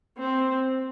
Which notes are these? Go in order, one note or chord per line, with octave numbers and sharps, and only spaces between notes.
C4